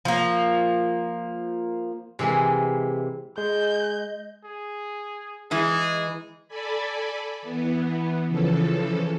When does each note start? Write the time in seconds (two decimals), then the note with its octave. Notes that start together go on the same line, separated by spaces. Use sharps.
0.05 F3 A#3
2.19 C3 E3 G#3 A#3
3.38 G#3 G#4 D#5 G6
4.45 G#4
5.51 E3 G#3 D#4 G#4
6.48 A4 D5 G#5 B5
7.42 E3 B3
8.28 C#3 E3 F3 A4